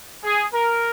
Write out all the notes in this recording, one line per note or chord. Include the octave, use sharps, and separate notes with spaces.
G#4
A#4